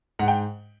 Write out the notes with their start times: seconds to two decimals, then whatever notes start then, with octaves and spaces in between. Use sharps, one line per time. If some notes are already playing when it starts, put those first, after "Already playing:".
0.19 G#2 F#5
0.28 G5